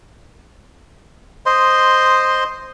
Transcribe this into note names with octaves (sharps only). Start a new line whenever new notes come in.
C5 D#5 C6